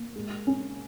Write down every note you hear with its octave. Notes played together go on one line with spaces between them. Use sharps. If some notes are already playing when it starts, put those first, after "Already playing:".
Already playing: A#3
G#3
C#4